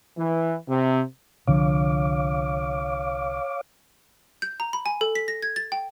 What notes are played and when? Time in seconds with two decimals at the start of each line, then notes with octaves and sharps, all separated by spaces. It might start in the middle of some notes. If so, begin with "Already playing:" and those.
0.17 E3
0.68 C3
1.47 C2 D3 F3 C#5 F5 D6
4.42 G6
4.60 A#5
4.73 B5
4.86 G#5
5.01 A4
5.15 B6
5.28 A#6
5.42 G#6
5.56 A6
5.72 G5